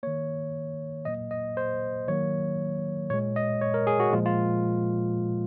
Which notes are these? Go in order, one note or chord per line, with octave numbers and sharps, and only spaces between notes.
D#3 A#3 C#5
A#2 F#3 A#3 D#5
D#5
C5
D#3 F#3 A#3 C#5
A#2 G#3 C#5
D#5
C#5
A#4
G#4
F#4
A#2 F3 G#3 F4
F4